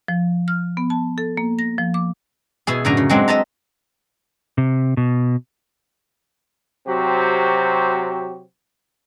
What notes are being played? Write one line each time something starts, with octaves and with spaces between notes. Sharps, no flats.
F3
F6
B3
A5
A4
A#3
A#6
F3
D6
B2 E4 G#4
F#2 A2 D3 D5 G#5 A#5
C#3
F#3 G#3 C4 D4
D#5 E5 A5 A#5
C3
B2
C3 F#3 C4 F#4 G4